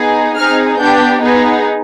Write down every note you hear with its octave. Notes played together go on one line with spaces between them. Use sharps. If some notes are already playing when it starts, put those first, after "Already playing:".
Already playing: B3 D#4 G#4
C4 D#4 G#4 F6
B3 D4 G4 G6
B3 D#4 G#4